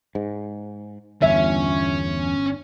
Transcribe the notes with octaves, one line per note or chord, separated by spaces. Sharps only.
G#2
G1 E2 C#4 E5